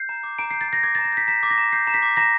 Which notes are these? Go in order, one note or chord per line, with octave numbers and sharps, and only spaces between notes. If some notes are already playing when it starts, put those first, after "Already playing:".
Already playing: G6 C7
A#5
D6
A#5 D7
G6 C7
A6
A#5 A#6
D6 G#6
A#5 A6
A#6
G6 B6
A#5 B6
D6
A#6
A#5
G6 C7
A#5
B6
D6
A#5 A#6